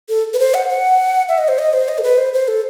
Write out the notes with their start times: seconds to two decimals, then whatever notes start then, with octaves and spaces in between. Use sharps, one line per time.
0.09 A4
0.34 B4
0.39 C5
0.54 F#5
0.69 F#5
1.29 E5
1.38 D#5
1.48 C5
1.59 D#5
1.73 C5
1.89 D#5
1.98 A4
2.03 B4
2.18 C5
2.33 C5
2.48 A4